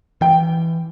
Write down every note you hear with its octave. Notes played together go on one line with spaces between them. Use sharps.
E3 G5